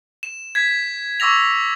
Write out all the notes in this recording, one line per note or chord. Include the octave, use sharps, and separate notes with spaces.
E7
G#6 B6
C#6 D6 E6 A#6 F7